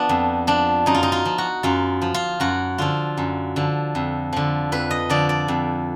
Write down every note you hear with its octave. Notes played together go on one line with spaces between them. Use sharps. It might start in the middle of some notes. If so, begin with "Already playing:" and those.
Already playing: F3 B3 D4
F2
F3 D4
F#2 D#4
F4
D#4
F4
F3
F#4
F#2 F4
F3
F4
F#2 F#4
D3 F3 F4
F#2
D3 F3
F2
D3 F3
F2 B4
D#5
D3 F3 D5
D5
F2